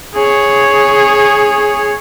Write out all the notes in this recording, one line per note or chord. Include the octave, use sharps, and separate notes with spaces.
G#4 C#5